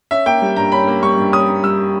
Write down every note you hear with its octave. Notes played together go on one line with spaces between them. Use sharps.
C#4 E5
A#3 G5
G3
G2 A#5
C#4 B5
A#3
G3 C#6
G2
C#4 D#6
A#3
G3 E6